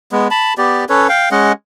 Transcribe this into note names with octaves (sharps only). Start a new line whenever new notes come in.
G#3 B3
A5 B5
B3 G4 D5
C#4 A4 B4 C#5
F5 G5
G#3 C#4 D#5 F#5